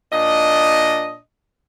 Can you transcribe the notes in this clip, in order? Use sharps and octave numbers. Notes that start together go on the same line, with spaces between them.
A#2 D4 D#5